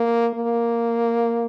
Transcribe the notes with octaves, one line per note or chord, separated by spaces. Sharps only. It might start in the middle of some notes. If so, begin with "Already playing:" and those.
Already playing: A#3
A#3